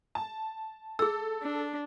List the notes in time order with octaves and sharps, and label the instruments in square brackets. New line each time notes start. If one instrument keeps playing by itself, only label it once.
[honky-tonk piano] A5
[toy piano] G#4 E6 [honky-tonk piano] A4
[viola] D4